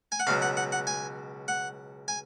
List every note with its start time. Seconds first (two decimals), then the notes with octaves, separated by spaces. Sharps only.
0.12 G#5
0.20 F#5
0.27 C#2 B2 F#3 F5
0.42 F#5
0.57 F#5
0.72 F#5
0.87 G#5
1.48 F#5
2.08 G#5